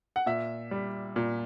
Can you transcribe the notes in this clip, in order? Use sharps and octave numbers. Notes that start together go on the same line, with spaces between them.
F#5
A#2 E5
G3
A#2